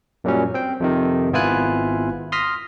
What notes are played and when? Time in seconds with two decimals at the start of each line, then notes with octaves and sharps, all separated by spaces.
0.24 F#2 A#2 F#3 G3 C#4
0.54 C4 G5
0.80 F2 C3 D#3
1.33 G#1 B3 E4 F4 G#5 F#6
2.32 C6 D#6 F6 A#6 B6